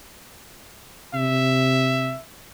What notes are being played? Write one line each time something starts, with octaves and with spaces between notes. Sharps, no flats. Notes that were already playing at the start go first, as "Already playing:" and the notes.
C3 E5